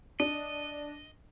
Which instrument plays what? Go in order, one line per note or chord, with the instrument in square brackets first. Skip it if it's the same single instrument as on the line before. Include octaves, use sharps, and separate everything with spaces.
[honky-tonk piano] D4 [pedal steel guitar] D#5